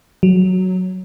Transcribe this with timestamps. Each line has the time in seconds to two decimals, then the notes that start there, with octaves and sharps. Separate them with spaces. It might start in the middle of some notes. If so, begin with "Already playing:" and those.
0.23 F#3